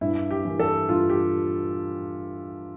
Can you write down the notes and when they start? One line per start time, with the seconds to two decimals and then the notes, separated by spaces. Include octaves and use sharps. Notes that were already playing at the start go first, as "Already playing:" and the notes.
0.01 G2 E4
0.31 G4
0.45 E3 A#3
0.60 A4
0.88 G2 F4
1.10 G4